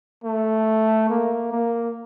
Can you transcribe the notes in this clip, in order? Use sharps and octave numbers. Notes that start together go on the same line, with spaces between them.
A3
A#3
A#3